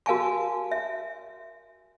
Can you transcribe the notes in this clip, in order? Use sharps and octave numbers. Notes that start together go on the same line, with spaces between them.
F#4 A#4 F5 G#5 A5 C#6
E5